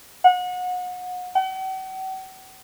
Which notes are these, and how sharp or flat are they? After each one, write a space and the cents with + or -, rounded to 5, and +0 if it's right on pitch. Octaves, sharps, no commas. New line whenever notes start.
F#5 -30
F#5 +45